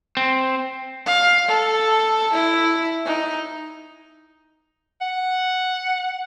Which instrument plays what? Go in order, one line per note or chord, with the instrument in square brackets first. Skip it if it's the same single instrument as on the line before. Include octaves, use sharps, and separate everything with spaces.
[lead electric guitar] C4
[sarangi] F5
A4
E4
D#4
[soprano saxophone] F#5